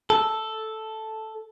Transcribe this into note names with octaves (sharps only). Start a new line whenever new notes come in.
A4